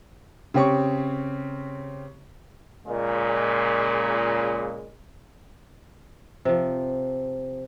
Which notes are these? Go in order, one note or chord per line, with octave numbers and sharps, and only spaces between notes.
C#3 C4 G4 C#5 C#6
A#2 C#3 G#3
C3 F3